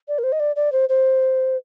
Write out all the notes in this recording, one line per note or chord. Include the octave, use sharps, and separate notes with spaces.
D5
A#4
C5
D#5
D5
D5
C5
C5